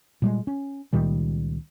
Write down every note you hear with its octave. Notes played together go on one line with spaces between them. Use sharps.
A#2 G3 G#3
C#4
C#2 A#2 D#3 G3